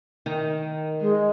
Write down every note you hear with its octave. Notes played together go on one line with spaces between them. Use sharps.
D#3
G#3